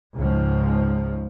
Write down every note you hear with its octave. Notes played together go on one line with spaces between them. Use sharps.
C#2 G#2 F3